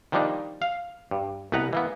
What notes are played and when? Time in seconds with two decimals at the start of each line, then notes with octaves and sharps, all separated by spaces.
0.12 D#3 F3 G3 A#3 D4 D#4
0.62 F5
1.11 G2
1.52 C2 B2 B3 B4 F#5 A#5
1.73 E3 A#3 B3